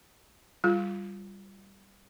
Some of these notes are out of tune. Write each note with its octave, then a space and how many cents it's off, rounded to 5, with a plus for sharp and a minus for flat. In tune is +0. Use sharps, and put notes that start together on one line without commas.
G3 +0 F4 -5